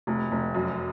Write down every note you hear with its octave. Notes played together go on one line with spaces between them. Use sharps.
F1
F1
F#2